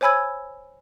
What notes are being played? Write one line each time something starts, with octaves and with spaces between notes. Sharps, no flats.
C5 C#5 G#5 B5 E6 G#6